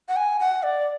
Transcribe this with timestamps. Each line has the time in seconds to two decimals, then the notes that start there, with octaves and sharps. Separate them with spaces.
0.08 F#5
0.16 G#5
0.39 F#5
0.63 D5